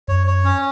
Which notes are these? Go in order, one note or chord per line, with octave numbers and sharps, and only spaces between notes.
F#2 C#5
C#5
C#4